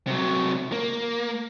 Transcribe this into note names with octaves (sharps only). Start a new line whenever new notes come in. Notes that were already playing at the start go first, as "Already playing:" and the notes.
C3 F#3
A#3